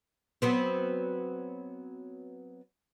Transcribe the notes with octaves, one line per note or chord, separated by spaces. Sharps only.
F#3 B3 C4